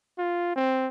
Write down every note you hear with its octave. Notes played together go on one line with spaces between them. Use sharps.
F4
C4